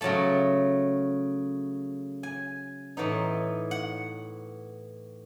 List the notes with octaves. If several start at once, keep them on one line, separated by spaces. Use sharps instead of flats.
C#3 F#3 A3 A5
G#5
A2 E3 B3 D#4
F#5